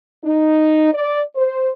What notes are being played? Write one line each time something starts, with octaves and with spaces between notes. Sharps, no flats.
D#4
D5
C5